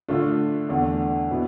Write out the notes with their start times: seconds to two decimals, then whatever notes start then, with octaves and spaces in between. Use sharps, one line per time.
0.08 D3 A3 D4 F4
0.69 E2 D3 A3
1.31 B2 B3 E4